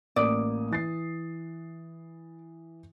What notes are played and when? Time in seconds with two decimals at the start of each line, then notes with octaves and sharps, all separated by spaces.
0.16 A1 A#3 D5 D#6
0.71 E3 A6 C7